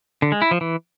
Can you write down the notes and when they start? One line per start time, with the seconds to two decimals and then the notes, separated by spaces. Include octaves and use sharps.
0.22 D3
0.32 G#3
0.42 E4
0.51 F3
0.61 E3